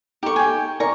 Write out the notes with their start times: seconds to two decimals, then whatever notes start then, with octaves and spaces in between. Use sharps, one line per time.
0.23 D#4 G4 A4 C#6
0.36 G5 G#5
0.80 D#4 A#4 D5 A#5 C#6